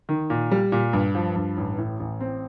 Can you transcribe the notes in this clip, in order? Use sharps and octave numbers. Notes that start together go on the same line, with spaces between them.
D#3
A#2
G3
A#2
G2
F3
G2
A1
A2
A1
C4